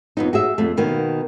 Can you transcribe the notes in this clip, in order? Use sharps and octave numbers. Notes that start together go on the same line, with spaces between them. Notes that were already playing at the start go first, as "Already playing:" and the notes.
F2 B3 D#4
F#4 G#4 E5
F2 A3
B2 D#3 A#3 B3